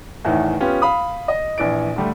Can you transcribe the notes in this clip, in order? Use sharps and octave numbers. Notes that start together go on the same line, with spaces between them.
E2 A2 D#3 E3
B3 C#4 F4 G4
F5 B5 D#6
D#5
A#1 E3 D5 D7
D3 G3 A3